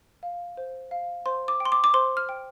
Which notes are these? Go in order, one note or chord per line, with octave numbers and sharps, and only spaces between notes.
F5
C5
F5
C5 C6
D6
G5
C6
D6
D6
C5 C6
F6
G5